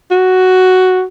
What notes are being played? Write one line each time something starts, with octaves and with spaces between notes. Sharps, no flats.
F#4